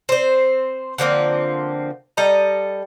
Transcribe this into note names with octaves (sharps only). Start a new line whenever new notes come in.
C4 C5
D3 F3 A#3 C4
G3 A4 D#5 A#5